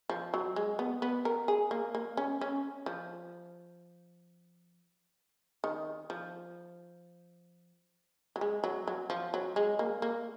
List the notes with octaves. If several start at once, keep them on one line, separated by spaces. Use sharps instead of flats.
F3
F#3
G#3
B3
B3
A#4
G#4
A#3
A#3
C#4
C#4
F3
D#3
F3
F#3
G#3
F#3
F#3
F3
F#3
G#3
A#3
A#3